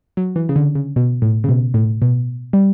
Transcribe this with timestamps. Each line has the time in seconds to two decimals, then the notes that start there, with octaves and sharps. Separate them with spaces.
0.17 F#3
0.36 E3
0.49 C#3
0.56 D3
0.75 C#3
0.96 B2
1.22 A2
1.44 C#3
1.49 B2
1.74 A2
2.02 B2
2.53 G3